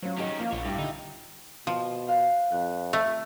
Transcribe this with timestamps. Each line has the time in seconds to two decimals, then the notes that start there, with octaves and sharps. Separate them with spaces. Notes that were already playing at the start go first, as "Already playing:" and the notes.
0.03 F#3 C#4 F4 C5
0.18 D#3 C#4 G4 G#4 D#5
0.40 F3 A#3 F4
0.53 A#1 B3 F4 C#5
0.65 G2 E4 F4 G4
0.78 D3 D#4
1.67 B2 F3
2.07 C5 F5 F#6
2.52 F2 F#6
2.93 A3